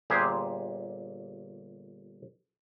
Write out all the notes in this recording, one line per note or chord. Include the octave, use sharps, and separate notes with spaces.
G1 A#2 G4 G#4 B4 C5